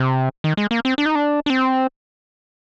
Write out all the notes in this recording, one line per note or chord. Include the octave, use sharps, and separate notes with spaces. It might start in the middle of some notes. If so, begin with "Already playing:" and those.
Already playing: C3
D#3
G#3
A#3
C4
D4
D#4
D4
D4
C4